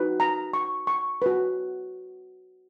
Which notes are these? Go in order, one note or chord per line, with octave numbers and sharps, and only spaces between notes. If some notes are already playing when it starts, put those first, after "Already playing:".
Already playing: D#4 F#4 B4
A#5
C#6
C#6
F#4 B4